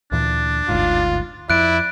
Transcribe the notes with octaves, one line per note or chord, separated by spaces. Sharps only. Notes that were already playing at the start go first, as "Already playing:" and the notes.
D2 A#2 E3 D4
G1 D2 G#2 F4
F2 E4 D5 F#6 D7